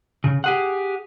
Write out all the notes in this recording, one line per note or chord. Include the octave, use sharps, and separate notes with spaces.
C#3
G4 G#4 F#5